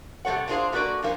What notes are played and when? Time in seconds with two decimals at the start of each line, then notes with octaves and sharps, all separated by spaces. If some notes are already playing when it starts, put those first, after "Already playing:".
0.25 C3 G3 A4 C#5 F#5
0.48 A#3 C4 D4 F4 G#4 C5
0.72 A3 A#3 F#4 A4 B4 D5
1.03 G2 F3 A#3 C#4